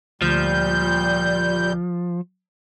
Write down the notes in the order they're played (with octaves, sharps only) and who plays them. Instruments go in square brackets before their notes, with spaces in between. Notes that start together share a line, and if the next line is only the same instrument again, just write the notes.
[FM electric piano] D2 F6 [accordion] A#2 G3 G6 [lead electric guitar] F3